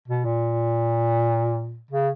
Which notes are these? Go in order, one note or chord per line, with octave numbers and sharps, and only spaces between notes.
B2
A#2
C#3